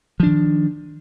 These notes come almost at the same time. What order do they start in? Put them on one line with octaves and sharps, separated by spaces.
F3 D4 D#3